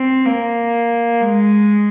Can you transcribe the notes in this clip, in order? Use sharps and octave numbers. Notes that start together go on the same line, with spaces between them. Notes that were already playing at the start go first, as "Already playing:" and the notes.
Already playing: C4
A#3
G#3